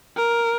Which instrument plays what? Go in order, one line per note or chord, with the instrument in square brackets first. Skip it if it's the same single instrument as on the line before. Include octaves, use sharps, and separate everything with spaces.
[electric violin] A#4